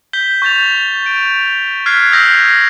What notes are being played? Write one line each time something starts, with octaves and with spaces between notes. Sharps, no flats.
G6 B6 G7
C#6 G6 A6 F7
D7
F6 F#6 G#6 B6 C7
D#6 E6 G6 A#6 C7